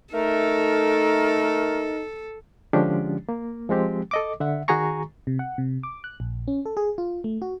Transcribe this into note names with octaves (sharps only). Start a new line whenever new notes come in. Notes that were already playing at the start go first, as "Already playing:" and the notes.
A3 D#4 A4 A#4
D3 F3 G#3 C#4 D4 G4
A#3
F3 G#3 C4 G4
A4 D#5 D6
D3 E5 F#5
D#3 F#4 G#4 G#5 A#5 C#6
C3
F#5
C3
D6
F#6
A#1
C#4
A4
G#4
F4
A3
F#4